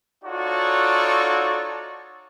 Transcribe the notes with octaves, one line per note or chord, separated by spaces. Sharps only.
D#4 F4 F#4 A4 C#5 D5